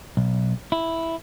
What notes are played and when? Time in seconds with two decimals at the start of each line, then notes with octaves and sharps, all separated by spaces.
0.17 B1
0.72 E4